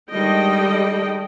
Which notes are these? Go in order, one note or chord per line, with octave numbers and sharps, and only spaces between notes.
D3 D#3 G3 G#3 D#5 G5